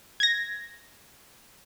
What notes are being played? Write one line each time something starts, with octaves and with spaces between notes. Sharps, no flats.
G#6 A#6